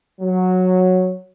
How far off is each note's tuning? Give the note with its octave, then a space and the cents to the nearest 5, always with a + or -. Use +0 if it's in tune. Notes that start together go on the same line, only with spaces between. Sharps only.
F#3 -10